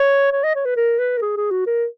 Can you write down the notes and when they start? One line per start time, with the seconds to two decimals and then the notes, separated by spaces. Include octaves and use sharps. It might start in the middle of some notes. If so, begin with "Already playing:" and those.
Already playing: C#5
0.33 C#5
0.44 D#5
0.55 C#5
0.66 B4
0.77 A#4
0.99 B4
1.17 A#4
1.22 G#4
1.37 G#4
1.51 F#4
1.67 A#4